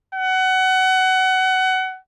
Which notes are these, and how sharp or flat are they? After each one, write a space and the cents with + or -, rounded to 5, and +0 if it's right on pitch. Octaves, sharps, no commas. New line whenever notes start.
F#5 +25